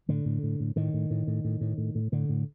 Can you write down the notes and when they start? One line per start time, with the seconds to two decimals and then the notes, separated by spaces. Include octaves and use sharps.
0.09 A2 D3
0.25 A2
0.43 A2
0.60 A2
0.76 A2 D#3
0.94 A2
1.10 A2
1.27 A2
1.45 A2
1.61 A2
1.78 A2
1.95 A2
2.12 A2 D3
2.29 A2